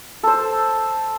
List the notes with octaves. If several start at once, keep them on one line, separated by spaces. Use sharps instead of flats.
A4 C5